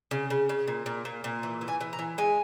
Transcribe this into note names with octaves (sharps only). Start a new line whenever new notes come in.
C#3
C#3
C#3
A#2
A#2
A#2
A#2
E3
E3
G#5
E3
A#5
E3
G#3 G#5